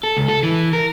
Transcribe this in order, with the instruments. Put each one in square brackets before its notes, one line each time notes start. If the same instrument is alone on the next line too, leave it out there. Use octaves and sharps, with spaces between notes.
[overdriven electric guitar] A4
C#2
A4
E3
A#4